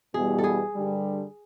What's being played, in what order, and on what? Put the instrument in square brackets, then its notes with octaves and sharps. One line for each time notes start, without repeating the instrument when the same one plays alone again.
[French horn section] E2 B2 G3 [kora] G#4
[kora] A4
G#4
[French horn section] G2 D3 G3